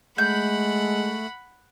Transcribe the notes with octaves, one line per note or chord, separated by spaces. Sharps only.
G#3 A3 F#5 B5 G6